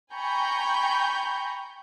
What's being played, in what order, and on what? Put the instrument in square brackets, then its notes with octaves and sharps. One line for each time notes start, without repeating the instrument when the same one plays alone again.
[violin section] G5 G#5 A#5 B5 C#6 G6